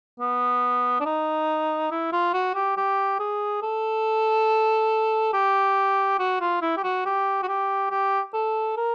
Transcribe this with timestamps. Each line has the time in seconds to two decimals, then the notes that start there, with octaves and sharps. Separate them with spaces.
0.20 B3
1.00 D4
1.06 D#4
1.91 E4
2.12 F4
2.34 F#4
2.55 G4
2.77 G4
3.20 G#4
3.63 A4
5.33 G4
6.19 F#4
6.41 F4
6.62 E4
6.77 G4
6.84 F#4
7.06 G4
7.43 F#4
7.48 G4
7.91 G4
8.34 A4
8.77 A#4